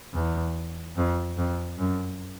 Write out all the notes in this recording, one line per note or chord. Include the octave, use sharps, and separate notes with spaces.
E2
F2
F2
F#2